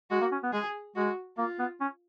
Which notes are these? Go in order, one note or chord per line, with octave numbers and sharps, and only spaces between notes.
G#3 F#4
A#3
C#4
B3
G#3 G#4
G#3 F#4
A#3 F4
B3
C#4